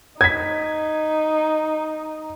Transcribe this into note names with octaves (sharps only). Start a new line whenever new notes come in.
D#4 G#6 B6